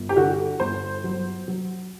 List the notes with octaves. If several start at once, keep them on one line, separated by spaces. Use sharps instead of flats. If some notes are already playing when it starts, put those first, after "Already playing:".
Already playing: G1
G4
D3 F#4
G1 C5
F#3
F#3